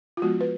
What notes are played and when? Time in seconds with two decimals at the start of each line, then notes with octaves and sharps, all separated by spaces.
0.17 F4
0.22 F3 G#3 B3 F#4
0.41 B4